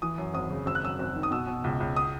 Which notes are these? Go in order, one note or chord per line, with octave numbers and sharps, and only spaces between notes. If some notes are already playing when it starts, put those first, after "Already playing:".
E3 D#6
F#2
G#1 D#6
C#3
G#1 E6
F#6
F#2 E6
G#1
D#3
D#6
B2 E6
B2
C#2
C#2
D#6